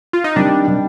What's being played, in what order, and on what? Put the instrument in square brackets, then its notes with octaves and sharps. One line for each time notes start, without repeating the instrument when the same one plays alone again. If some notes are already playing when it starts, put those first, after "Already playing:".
[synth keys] F4
D#4
[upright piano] C3 D#3 G3 [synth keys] D4
[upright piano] C3 D#3 G3